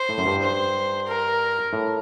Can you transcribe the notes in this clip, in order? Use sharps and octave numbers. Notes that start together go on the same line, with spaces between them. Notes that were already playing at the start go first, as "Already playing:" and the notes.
Already playing: C5
A2
F#2
G2
C5
A#4
A2